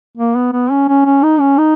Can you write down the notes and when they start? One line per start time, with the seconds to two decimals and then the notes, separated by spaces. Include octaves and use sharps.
0.17 A#3
0.35 B3
0.53 B3
0.71 C#4
0.89 C#4
1.05 C#4
1.23 D#4
1.40 C#4
1.58 D#4